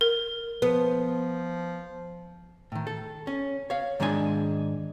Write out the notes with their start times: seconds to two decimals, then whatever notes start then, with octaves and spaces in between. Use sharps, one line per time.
0.01 A#4
0.62 F3 B3
2.72 A2 D#3
2.87 A4
3.27 C#4
3.70 C#5 F5
4.00 G#2 D#3 G#3 D4 G#5